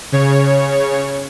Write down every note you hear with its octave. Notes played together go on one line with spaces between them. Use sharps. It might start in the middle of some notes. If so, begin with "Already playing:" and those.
C#3 C#5